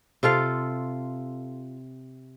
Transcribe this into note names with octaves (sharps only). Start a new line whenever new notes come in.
C3 F4 A4 F5